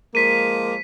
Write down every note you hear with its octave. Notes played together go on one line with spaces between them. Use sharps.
F3 G#3 A#3 B6 D#7